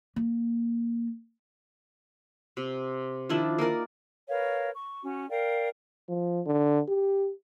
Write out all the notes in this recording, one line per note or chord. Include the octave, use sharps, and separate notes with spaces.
A#3
C3
D#3 F3 D4 E4
A#3 D#4 A#4 D5
A#4 B4 C#5 F5
C#6
C#4 F#4
A#4 D5 F5 G5
F3
D3
G4